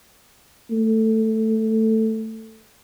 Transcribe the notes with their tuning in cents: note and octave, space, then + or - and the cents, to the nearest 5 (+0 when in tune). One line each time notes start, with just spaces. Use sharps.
A3 +5